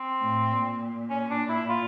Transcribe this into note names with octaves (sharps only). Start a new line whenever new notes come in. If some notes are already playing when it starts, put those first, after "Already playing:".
Already playing: C4
A2
A#2
C#4
D4
E4
F4